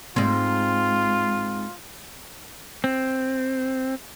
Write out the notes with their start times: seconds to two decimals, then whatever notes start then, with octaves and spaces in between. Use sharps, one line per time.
0.16 G#2 C4 F4
2.84 C4